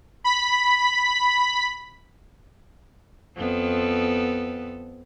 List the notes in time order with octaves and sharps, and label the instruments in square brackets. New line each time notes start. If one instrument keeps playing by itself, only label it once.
[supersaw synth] B5 B6
[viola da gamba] F2 B3 A4